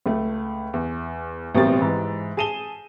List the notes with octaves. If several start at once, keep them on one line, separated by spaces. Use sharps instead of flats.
C#2 A3
E2
A1 B2 G3 C4 A#4 A6
G#2 E3
G#4 A5 D#7 E7 G7